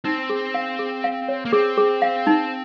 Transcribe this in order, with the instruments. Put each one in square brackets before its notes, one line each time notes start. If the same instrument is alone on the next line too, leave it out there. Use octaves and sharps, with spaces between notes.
[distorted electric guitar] C4 [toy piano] D#4
[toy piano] G#4
F5
G#4
F5
C#5
[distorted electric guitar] A#3
[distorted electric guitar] C4 [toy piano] G#4
[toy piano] G#4
F5
D#4